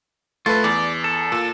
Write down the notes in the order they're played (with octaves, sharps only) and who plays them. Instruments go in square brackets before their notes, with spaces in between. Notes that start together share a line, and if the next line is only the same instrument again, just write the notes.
[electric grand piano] A3 A4 B4 [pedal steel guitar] F4
[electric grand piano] E2 [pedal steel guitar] D5
[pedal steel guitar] A4
[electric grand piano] A#2